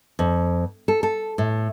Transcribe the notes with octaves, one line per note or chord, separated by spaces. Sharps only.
F2
A4
A4
A2